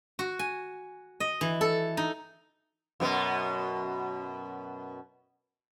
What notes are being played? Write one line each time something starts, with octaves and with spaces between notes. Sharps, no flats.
F#4
G#5
D#5
E3
A4
D#4
F#2 B2 B3